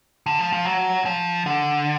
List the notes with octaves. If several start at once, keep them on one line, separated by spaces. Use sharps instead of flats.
D3
F3
F3
F#3
F3
D3